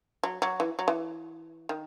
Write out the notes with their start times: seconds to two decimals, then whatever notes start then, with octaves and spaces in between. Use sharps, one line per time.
0.23 F#3
0.42 F#3
0.60 E3
0.79 F#3
0.88 E3
1.69 D#3